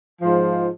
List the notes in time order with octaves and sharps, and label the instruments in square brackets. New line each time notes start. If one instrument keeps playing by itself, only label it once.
[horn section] G#2 F3